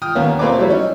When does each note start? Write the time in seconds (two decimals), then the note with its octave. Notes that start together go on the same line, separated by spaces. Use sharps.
0.02 G5 D#6 F6
0.15 D#2 A#3 B3 C#4
0.39 A3 A#3 C4 B4 C#5 D6
0.58 F#3 G3 E4 C#5
0.70 C#4 D#4